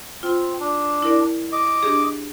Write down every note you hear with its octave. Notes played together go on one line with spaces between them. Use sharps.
C4 F4
D4
E4 A#4 D5
D#5 D6
D4 G4 G#4